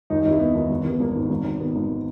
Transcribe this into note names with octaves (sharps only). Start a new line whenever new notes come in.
D#2 D#4
D#4
D#2
E4
D#2 B3
D#2
G#1
E3 B3
G#1 A#3
G#2
G#1
G#1
D#3 B3
G#1